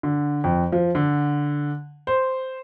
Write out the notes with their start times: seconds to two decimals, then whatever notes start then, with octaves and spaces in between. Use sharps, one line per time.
0.03 D3
0.44 F2
0.72 F3
0.95 D3
2.07 C5